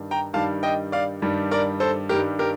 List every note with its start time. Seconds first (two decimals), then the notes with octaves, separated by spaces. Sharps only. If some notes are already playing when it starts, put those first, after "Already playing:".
Already playing: G2 D#3 G3
0.11 G5 A#5
0.33 G2 D#3 G3 F5 A5
0.63 D#5 G5
0.92 D5 F5
1.22 G2 D#3 G3
1.51 A#4 D5
1.80 A4 C5
2.09 G2 D#3 G3 G4 A#4
2.39 G4 A#4